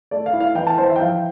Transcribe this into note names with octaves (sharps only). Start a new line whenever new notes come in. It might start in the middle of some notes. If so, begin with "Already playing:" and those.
A3 D5
F5
E4
F5
E3 G5
A5
E3 C5
E5
G5
F3 F5